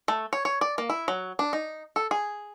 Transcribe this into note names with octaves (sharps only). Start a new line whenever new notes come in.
A3
C#5
C#5
D5
A#3
E4
F#3
D4
D#4
A4
G#4